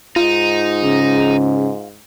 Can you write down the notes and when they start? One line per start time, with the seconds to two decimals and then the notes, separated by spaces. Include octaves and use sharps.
0.16 G#2 D#4 F4
0.83 C#3